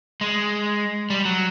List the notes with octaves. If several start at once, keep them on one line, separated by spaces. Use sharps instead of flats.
G#3
G3
F#3